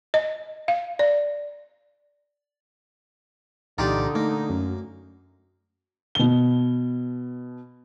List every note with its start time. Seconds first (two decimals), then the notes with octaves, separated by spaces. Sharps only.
0.14 D#5
0.68 F5
0.99 D5
3.78 C2 A#2 D3 E3 D#4 F4 G4 D5
4.15 A3 A#3
4.50 F#2
6.15 B2 G7